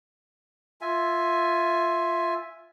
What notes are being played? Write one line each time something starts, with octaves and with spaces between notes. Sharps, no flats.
F4 E5 G#5